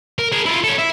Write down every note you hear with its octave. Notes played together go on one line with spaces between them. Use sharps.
A#4
G#4 A#4
E4 F4
C#4 A4
E4